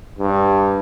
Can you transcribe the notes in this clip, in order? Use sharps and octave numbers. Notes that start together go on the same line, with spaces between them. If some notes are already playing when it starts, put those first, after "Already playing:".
G2